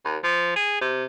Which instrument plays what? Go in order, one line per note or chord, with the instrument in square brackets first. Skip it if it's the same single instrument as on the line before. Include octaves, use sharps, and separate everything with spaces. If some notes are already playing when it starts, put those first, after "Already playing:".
[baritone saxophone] D#2
F3
G#4
C3